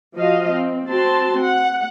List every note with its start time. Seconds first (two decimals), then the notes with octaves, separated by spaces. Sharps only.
0.17 F3 F#4 D#5 F5
0.55 C4
0.89 C4 F#4 A5 C6
1.42 F#5